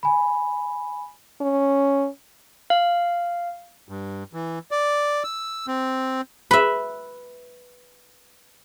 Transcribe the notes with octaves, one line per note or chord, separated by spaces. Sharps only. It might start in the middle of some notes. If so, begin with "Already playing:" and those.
G#5 B5
C#4
F5
G2
E3
D5
E6
C4
B4 E5